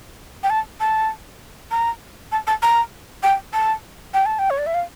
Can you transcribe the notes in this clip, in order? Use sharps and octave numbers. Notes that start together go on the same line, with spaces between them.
G5
A5
A5
A#5
A5
A5
A#5
G5
A5
G5
A5
G5
C#5
D5
E5
F5